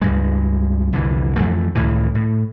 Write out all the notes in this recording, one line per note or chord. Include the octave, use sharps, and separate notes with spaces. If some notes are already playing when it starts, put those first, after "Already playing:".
C#2 G2 G#3
C2 F2 D3 E3
F2 E3 A3
C#2 A2 D#3 E3
A2